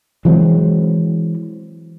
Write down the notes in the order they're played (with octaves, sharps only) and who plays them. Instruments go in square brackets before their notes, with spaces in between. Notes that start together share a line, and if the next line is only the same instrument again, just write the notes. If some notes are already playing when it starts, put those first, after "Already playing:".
[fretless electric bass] E3 F#3 G#3 C4